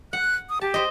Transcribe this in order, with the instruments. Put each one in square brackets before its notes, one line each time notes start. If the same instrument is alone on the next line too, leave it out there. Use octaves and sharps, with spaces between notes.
[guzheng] F#5 [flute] F#6
[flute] D#6
[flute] G4 [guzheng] A5
[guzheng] C5 D#5